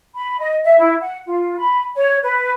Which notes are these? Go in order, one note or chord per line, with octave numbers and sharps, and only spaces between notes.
B5
D#5
E5
E4
F#5
F4
B5
C#5
B4